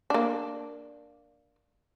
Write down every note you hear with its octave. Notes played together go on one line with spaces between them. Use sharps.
A#3 D4